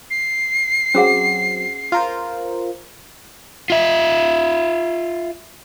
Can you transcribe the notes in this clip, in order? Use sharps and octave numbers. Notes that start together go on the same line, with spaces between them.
C7
F#3 C4 C#4 G#4 F#5
F4 A#4 C5
F4 E5